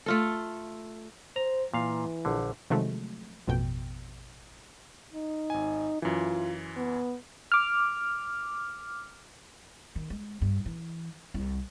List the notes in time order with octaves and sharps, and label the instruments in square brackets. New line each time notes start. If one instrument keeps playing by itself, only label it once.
[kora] A3 F4 A4
[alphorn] C5 [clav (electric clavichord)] A#5
[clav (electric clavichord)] A#2 F5 [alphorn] E3
[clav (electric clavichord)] A#1 D3
[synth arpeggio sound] C3 D#3 F3 F#3 G#3 A3
A1 F2 B2 G5
[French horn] D#4
[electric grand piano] G#1 G#5
[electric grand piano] F#2 E3 [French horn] F4
[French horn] B3
[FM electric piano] D6 F6
[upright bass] D#3
G#3
G2
E3
C2